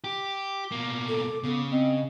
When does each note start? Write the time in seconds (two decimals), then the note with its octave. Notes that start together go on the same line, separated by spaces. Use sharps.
0.04 G4 D6
0.72 B2 A#3
1.08 A4
1.44 C#3 B3
1.71 C4 D#5